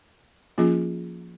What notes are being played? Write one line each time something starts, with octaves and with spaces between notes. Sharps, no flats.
F3 A#3 C#4 F4 G#4